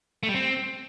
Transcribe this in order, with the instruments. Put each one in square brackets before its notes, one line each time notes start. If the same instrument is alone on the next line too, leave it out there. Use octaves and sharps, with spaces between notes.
[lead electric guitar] A3
G3
C4